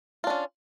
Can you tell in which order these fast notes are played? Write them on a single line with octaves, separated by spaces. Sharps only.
F4 D4 C#4